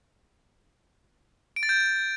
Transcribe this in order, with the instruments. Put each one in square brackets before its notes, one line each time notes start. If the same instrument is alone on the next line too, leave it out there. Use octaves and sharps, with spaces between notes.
[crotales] D7
A6
G6